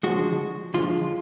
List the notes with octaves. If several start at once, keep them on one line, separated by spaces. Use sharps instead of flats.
D3 F3 G#3 F#4
D3 F3 G#3 F4